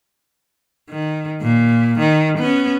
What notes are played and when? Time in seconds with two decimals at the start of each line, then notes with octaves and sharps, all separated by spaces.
0.90 D#3
1.42 A#2
1.99 D#3
2.38 B3 C#4